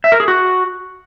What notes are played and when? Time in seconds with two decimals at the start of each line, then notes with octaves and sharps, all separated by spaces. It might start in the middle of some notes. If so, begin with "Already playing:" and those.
0.04 E5
0.12 A#4
0.20 G#4
0.28 F#4